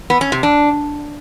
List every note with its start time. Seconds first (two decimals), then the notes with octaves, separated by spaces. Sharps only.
0.10 B3
0.21 C#4
0.32 C3
0.43 D4